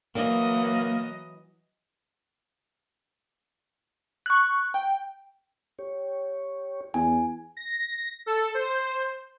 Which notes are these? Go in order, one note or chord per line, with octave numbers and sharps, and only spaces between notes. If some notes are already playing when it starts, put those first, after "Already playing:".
E3 F#3 A#3 D#5
C#6 F#6
G5
G4 C#5
E2 G#5
A#6
A4
C5